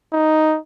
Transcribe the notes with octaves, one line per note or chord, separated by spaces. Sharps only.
D#4